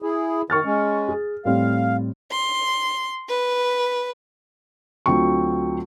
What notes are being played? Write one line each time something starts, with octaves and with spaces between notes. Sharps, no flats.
E4 G#4
D#3 C#6 F6 A6
G#3 C#4
G#4
A2 G3 C4 F5
C6
B4
D2 F#3 C4 F4 C#6